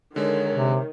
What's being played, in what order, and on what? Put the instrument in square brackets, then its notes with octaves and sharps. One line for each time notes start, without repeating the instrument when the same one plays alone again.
[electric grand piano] D3 G#3 [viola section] D#3 [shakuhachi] C#5
[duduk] C3